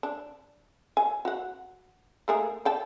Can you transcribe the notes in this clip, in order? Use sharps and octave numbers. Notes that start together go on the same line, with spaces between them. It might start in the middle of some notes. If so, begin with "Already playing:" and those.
D4
G#5
F#4 F#5
A3 A#3 G#4
D5 G5 A5